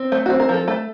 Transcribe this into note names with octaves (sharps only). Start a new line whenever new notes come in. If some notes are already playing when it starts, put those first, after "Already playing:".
Already playing: C4
A3 C5
F#4
C4
A#4
F3
A4
A3 A4